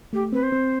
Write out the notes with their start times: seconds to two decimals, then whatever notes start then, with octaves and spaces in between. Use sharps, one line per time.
0.13 A3 G4
0.32 C4 B4
0.43 C5
0.52 C4